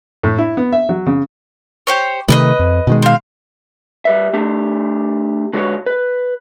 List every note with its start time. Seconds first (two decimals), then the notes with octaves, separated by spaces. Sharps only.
0.23 A2
0.38 E4
0.57 B3
0.72 E5
0.89 F#3
1.06 C#3
1.87 G4 C5 C#5
2.28 C3 D#3 A3 B4 D5 D#5
2.59 F2
2.87 B2 D#3 G#3
3.02 C4 F5
4.05 G3 B4 E5
4.33 A3 D4 G4
5.53 D3 G#3 F#4 A4 B4 C#5
5.86 B4